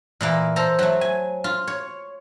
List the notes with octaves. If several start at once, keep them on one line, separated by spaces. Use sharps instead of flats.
A#2 E3 A#3
A4 C5 A#5
F#3 A3
G#5
F4
C#5